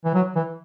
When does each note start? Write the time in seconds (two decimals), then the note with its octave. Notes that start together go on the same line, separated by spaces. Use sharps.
0.05 E3
0.14 F#3
0.36 E3